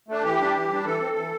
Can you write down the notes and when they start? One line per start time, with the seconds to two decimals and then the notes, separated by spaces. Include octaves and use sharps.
0.08 A3 D4
0.24 E3 G4
0.39 G3 D4
0.55 E3
0.70 G3 D4
0.85 E3 A4
1.01 C4
1.16 E3